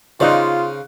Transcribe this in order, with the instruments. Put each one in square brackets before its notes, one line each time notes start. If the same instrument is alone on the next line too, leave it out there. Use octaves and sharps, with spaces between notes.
[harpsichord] C#3 [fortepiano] D#4 D5 [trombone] F4 [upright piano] C5 F5 F#6